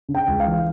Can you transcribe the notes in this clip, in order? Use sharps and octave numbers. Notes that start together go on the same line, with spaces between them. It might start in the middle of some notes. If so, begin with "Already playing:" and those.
C#3
G5
C#2
F5
E3